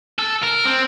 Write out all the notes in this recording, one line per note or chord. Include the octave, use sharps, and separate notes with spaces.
A4
A#4
C4